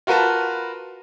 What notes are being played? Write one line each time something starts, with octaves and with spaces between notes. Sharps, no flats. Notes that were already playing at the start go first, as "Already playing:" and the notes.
F4 F#4 A#4 B4 A5